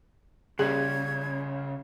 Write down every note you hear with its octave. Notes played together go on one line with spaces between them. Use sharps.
A#1 C#3 G3 C#4 G#4 G#6